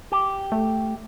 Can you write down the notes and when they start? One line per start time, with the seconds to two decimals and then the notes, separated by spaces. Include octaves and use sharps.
0.12 G4
0.52 A3